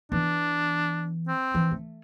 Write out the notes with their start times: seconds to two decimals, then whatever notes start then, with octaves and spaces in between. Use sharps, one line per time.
0.12 E3 B3 D4
1.28 C4
1.55 E3
1.71 A3